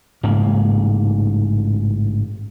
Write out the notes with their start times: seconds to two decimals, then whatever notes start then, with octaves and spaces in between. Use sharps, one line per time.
0.23 A1 G#2 C#3 A#3